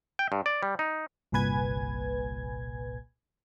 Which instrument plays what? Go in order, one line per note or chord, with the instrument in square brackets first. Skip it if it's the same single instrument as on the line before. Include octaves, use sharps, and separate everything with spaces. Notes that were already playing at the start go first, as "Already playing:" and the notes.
[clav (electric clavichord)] G5
G2
D5
G3
D#4
[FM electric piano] G1 C2 A#2 B4 G#5 G#6